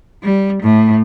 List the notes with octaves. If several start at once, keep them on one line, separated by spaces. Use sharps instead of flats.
G3
A2